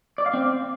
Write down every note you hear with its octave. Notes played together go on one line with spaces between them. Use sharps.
D5
F5
C4